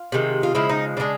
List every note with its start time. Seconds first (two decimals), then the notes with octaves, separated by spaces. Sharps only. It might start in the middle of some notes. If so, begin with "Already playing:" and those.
Already playing: F4
0.12 C3 D#3 G#3
0.43 F4
0.55 C#3 F3 G#3 E4
0.69 D#4
0.97 C#3 F3 G#3 D4